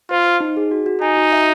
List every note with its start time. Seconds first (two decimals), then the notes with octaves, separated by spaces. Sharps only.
0.10 F4 C5
0.26 C5
0.40 D#4
0.57 G#4
0.71 F#4
0.86 F#4
1.02 D#4 G#5
1.17 F#4
1.33 E5